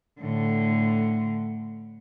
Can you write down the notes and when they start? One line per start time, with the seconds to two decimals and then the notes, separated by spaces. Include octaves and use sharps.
0.21 A2 D3